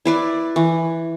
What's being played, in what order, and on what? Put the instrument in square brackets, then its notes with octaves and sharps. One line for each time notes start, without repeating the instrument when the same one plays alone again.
[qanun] E4 B4 D5
E3